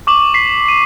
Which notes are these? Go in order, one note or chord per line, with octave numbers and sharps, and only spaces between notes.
C#6 D6 F#7
B6 C7
D#7